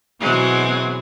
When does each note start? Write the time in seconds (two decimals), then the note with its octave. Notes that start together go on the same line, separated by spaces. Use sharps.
0.20 B2 E3 F#3 G#3 C4